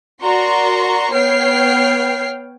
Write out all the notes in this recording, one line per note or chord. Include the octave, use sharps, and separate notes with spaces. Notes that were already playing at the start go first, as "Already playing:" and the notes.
F#4 A#4 D5 A#5 C6 C#6
B3 C#5 G5 F6 C7